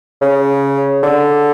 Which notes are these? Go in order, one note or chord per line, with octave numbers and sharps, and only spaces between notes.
C#3
D3